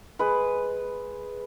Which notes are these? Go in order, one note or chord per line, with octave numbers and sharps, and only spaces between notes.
G#3 B4